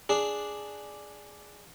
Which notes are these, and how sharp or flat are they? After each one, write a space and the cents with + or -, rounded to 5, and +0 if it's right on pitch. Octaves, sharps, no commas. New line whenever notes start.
D4 +0 G#4 +0